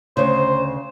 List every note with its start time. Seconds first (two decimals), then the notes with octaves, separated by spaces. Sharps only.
0.17 D2 C#3 C5